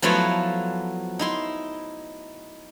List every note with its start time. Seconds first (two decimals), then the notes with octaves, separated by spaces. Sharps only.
0.02 F3 F#3 A3 B3 E4 F4
1.19 D#4 E4 C6